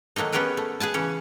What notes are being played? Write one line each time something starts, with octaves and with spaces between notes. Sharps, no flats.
D#3 F#3 A3 A#3 D#4
B3 C#4 G4 G#4 A#4 B4
A3
G#4 B4 G#5 A5
C#3 E3 C#4